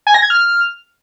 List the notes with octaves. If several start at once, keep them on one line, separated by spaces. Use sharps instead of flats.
G#5
A#6
G#6
F6